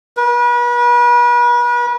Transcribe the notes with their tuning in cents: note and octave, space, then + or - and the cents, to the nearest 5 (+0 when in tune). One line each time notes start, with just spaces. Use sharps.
B4 -40